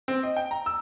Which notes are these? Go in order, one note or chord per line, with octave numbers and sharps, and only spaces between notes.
C4
D#5
G5
A#5
E6